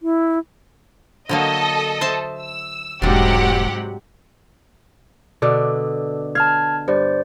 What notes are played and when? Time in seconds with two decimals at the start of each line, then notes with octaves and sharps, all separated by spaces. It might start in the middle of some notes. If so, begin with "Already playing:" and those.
0.02 E4
1.29 D3 F#3 A#3 A4 D#5
2.01 C5 E5 A5
2.41 E6
3.02 E1 G#2 C3 F#3 G3 D4 G4 F#5
5.42 B2 D3 D4 A4
6.35 F5 A5 F6 G#6
6.88 G2 C5 D5